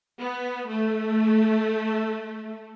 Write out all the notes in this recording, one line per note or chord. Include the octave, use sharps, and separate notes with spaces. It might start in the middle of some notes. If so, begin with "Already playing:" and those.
B3
A3